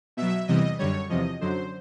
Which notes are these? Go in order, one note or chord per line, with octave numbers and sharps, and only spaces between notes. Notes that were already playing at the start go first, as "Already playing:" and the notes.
B2 F#3 E5
E2 C3 E3 G3 D#5
F#2 D3 G3 C#5
E2 C3 F3 D#5
F#2 D3 F#3 C5